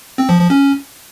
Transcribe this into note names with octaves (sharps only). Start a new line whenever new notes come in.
C4
F3
F3
C#4